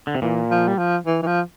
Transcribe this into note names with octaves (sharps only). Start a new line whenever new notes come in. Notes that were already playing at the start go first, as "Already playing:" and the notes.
D3
C3
A#2 E3
F3
G3
F3
E3
E3
F3